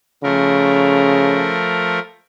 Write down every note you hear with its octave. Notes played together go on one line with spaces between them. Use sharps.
C#3 F3 A3 A#4